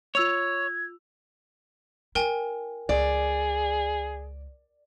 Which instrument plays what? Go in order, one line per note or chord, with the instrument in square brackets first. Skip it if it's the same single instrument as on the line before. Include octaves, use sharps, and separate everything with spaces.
[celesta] F4 E6 F7 [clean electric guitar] C#5 [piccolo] G#6
[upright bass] E4 [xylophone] A#4 G5 G#5
[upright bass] C#2 [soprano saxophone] G#4 [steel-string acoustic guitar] D5